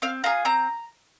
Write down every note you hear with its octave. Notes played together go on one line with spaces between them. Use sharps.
C4 F5
F4 G#4 A#5
C4 A#5